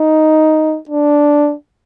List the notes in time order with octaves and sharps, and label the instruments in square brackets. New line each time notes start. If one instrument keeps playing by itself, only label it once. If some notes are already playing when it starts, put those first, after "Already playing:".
Already playing: [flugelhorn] D#4
D4